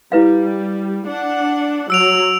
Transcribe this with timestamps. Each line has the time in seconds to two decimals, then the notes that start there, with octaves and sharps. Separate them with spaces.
0.12 G3 E4 B4 F5
1.08 D4 F#5
1.90 F#3 E6 D7 F7